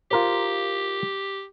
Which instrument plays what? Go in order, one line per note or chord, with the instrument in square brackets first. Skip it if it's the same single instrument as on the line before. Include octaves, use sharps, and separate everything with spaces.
[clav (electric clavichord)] F4 A#4 C5 [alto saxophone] G4